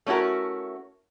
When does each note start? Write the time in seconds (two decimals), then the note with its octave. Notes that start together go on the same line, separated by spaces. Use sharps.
0.06 A3 C#4 E4 F#4 A#4